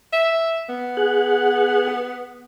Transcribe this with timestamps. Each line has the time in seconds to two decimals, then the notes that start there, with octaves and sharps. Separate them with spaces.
0.13 E5
0.69 B3
0.97 G#4 F#5